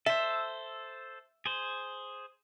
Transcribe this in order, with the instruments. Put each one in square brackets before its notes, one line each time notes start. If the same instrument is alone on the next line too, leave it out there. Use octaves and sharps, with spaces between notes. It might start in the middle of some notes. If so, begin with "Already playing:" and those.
[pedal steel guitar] A4 C5 [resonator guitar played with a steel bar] E5
[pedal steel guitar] G#4 C5